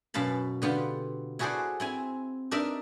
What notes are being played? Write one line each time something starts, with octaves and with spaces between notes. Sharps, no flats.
F#2 B2 F5 A5 B5
D3 B3 F4 G4
E4 F#4 G#4 A4 C5 D5
C4 E4 G#5
D4 D#4 A#4 D5 E5